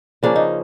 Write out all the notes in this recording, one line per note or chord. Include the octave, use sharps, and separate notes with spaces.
C#3 F3 A#3 C#4 D4
D#4